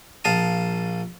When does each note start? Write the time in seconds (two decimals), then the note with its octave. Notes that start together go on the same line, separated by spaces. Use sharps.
0.25 A#1 F5 A5 D#6